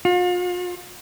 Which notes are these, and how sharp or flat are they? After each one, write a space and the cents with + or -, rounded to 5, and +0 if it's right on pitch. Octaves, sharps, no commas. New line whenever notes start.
F4 +40